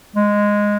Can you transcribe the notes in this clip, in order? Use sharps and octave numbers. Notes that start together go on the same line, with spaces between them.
G#3